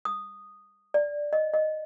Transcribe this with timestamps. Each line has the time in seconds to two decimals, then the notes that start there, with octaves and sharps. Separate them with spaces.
0.05 D#6
0.94 D5
1.33 D#5
1.54 D#5